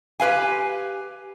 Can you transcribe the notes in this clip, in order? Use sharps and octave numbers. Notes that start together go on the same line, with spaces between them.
G4 B4 F5 G#5